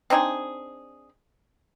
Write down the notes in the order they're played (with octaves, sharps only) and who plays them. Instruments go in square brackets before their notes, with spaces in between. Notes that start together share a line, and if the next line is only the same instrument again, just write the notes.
[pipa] C4 D4 D#4 G#4